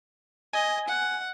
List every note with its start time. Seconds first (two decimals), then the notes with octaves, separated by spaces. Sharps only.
0.53 D#5 G#5
0.88 F#5